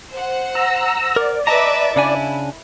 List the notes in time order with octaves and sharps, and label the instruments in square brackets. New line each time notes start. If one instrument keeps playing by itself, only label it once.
[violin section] C5 F#5
[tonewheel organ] A#5 E6
[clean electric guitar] A#4 [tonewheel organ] D5
[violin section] B4 E5 D6 [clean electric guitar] D#5 A5 A#5
[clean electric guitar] C#3 D4 G#5 [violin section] E4